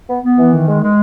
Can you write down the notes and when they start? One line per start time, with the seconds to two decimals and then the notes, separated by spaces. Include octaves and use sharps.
0.09 B3
0.24 B3
0.38 E3
0.53 D#3
0.67 G#3
0.82 G#3